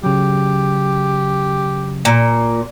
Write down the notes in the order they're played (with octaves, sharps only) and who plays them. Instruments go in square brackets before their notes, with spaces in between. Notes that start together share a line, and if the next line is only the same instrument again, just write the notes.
[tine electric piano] C#3 F#3 [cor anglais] G4
[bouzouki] A#2